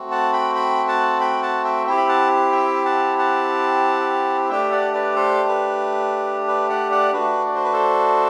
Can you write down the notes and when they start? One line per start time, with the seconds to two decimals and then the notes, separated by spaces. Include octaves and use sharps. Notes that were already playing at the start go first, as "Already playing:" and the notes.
Already playing: A3 C4 F#4
0.11 F#5 A5
0.33 G5 B5
0.55 G5 B5
0.89 F#5 A5
1.20 G5 B5
1.43 F#5 A5
1.64 E5 G5
1.87 C4 E4 G4 E5 G5
1.97 B5
2.09 F#5 A5
2.52 E5 G5
2.85 F#5 A5
3.19 F#5 A5
4.49 A3 D4 G4 E5 G5
4.72 D5 F#5
4.94 B4 D5
5.16 A4 C5
5.48 B4
6.48 B4 D5
6.69 D5 F#5
6.91 D5 F#5
7.13 A3 D4 F#4 B4
7.46 D5
7.55 C5
7.64 B4
7.73 A4 C5